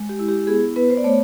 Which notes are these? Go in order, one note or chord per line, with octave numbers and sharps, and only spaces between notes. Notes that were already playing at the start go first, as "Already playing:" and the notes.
Already playing: G#3
G4
E4
G4
B3 G#4
B3 B4
C5
D5
A3 C#5